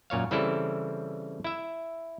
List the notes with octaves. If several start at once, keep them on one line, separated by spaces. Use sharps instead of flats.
F#2 A#2 C#5 F5
C#3 E3 G3 C4 E4 A4
E4 E5